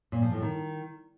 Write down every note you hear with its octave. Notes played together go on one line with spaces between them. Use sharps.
A#2
F3
A2
D#3